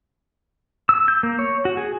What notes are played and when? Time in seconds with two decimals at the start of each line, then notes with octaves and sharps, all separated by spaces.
0.89 E6
1.08 G6
1.23 A#3
1.39 C#5
1.65 F#4
1.77 G#4